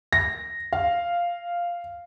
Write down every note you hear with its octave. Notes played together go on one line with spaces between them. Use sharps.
A#6
F5